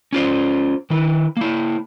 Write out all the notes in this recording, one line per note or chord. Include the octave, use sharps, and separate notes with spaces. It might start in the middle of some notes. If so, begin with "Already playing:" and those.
C#4 F4 C5
D#3 E4
A#3 E4